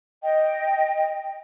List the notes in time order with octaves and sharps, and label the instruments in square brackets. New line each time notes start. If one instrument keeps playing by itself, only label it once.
[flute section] D#5 G5